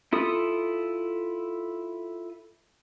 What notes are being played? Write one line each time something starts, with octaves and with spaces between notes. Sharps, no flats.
E4 F4 A4 D#6